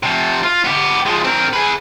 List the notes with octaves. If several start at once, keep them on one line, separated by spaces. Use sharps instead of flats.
C3 F3
F4
B3 G4
F3 G#3
C4 A#4
G#4 B4